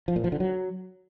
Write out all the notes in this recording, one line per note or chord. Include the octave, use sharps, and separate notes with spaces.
F3
A#2
F3
D3
F#3